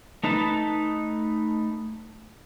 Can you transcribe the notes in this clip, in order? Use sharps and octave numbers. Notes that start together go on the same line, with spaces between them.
A3 D#4 B4 A5